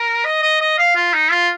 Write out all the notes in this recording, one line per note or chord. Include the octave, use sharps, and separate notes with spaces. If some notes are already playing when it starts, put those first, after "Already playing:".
Already playing: A#4
D#5
D#5
D#5
F5
F4
D#4
F4